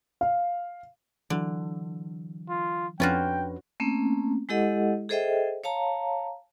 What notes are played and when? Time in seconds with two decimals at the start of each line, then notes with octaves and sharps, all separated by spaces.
0.21 F5
1.30 D3 E3 F#3
2.49 F4
3.00 F2 C#4 D4 F4 F#4 B4 G5
3.80 A3 A#3 C4 C#4
4.49 G#3 E4 G4 A4 D#5 F#5
5.09 G#4 A4 C5 D#5 E5 G5
5.64 C#5 F5 A5 A#5